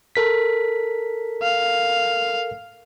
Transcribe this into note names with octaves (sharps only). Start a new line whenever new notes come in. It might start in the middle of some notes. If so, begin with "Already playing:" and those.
A4 A#4 B6
F5